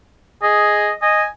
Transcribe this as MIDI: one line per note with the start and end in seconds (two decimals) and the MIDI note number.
0.43 0.90 68
0.43 0.93 75
1.02 1.23 75
1.02 1.28 80